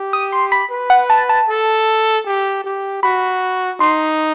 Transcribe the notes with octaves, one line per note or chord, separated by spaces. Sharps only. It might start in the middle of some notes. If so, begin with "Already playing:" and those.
Already playing: G4
D#6
C6
B5
B4
F#5
A5
A5
A4
G4
G4
F#4 B5
D#4 C6